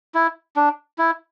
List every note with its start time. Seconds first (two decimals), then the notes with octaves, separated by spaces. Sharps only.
0.15 E4
0.56 D4
0.98 E4